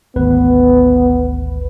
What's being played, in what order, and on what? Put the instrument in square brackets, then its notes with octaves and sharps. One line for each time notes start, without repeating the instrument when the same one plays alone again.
[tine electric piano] G#1 D2 B4 [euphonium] B3